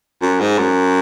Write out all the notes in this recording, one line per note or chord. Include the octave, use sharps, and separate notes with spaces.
F#2
G#2
F#2